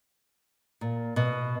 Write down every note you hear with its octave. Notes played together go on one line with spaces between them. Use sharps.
A#2
B2